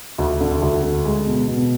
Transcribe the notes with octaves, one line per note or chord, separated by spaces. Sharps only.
D2
D3
D2
D3
G#3
B2
B2